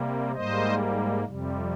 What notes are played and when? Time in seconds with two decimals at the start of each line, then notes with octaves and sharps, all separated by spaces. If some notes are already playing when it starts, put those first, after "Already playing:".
Already playing: C3 G3 A#3
0.35 G#2 G3 A#3 C5 D#5
1.24 F2 C3 G3